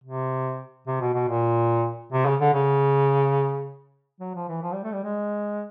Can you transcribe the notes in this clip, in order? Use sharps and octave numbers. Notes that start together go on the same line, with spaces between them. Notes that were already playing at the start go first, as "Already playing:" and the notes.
C3
C3
B2
B2
A#2
C3
C#3
D3
C#3
F#3
F3
E3
F3
G3
A3
G3
G#3